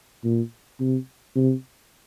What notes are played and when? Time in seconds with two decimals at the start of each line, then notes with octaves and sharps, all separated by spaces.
0.24 A#2
0.80 C3
1.36 C3